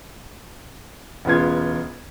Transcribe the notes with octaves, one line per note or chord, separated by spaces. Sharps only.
E1 C#3 B3 F4 G#6